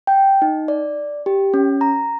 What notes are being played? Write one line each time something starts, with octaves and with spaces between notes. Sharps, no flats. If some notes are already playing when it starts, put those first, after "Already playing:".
G5
D#4
D5
G4
C#4
A#5